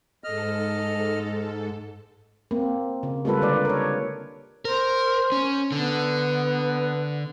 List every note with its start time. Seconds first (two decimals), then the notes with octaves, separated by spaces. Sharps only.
0.24 G#2 A4 D#5 F6
2.51 A#3 C4
3.03 C#3
3.25 G3 G#3 A#3 F4 A4 B4
3.42 D3 B4 D5
3.65 A#4 C#5
4.65 A#4 C5
5.32 C#4
5.72 D3 B3